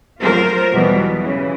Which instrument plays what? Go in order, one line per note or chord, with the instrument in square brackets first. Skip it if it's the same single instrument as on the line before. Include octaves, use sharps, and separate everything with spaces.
[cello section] F#3 A3 F4 A#4 C5
E2 B2 E3 F#3 G3 B3
C#3 E3